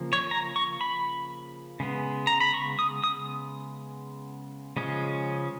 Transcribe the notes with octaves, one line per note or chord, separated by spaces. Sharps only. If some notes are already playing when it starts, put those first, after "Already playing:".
Already playing: C#3 F3 A#3
C#5
A#5
C#6
B5
C#3 G#3 B3
A#5
B5
C#6
D#6
D#6
C#3 F3 G#3 C#4